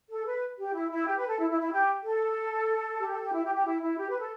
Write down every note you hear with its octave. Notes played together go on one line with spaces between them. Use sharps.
A4
B4
G4
E4
E4
G4
B4
A4
E4
E4
E4
G4
A4
G4
A4
G4
E4
G4
G4
E4
E4
G4
B4
A4